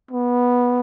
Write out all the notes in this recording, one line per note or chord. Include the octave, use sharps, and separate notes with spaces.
B3